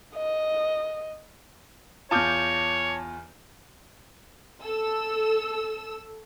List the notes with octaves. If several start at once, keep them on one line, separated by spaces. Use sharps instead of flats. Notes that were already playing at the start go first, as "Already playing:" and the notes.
D#5
E2 F4 C#5 A5 D6 G6
A4 E6